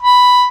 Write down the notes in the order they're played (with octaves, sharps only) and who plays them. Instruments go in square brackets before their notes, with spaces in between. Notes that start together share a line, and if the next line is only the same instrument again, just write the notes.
[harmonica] B5